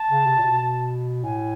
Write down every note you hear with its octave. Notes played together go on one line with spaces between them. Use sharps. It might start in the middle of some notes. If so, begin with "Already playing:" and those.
Already playing: A5
C#3
C3
A#2
B2
A2 G#5